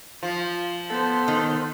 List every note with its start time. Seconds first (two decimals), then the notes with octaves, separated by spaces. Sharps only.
0.23 F3 F4
0.90 B3 A4 C5
1.28 D#3